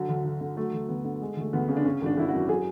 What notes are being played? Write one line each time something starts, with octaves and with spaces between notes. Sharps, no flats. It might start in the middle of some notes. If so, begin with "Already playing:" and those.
Already playing: D3 F#3
D2
D2
D3
F#3 A3
D2
D2 B3
D3
G#3
D2 A3
D2 B3
C#3
D4
C#3 C#4
G#1 D4
G#1 E4
F#2 F#4
F#3 G#4